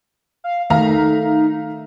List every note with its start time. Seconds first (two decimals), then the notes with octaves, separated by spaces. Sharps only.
0.44 F5
0.70 D#3 A3 D#4 E5 F5 A#5